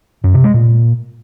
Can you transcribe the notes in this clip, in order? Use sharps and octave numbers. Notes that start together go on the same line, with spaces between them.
F#2
C3
G#3
A#2